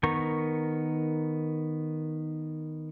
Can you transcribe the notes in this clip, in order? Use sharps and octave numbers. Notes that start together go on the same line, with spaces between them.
D#3 B3 A#4 C#6